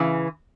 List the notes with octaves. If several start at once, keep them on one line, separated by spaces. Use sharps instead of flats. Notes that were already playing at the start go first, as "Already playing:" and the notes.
Already playing: C#3 E3